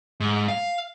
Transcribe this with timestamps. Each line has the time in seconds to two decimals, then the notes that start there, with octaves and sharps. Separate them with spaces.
0.20 G#2
0.48 F5